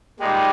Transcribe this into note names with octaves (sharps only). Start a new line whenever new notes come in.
A#2 G3 G#3 D#4 G4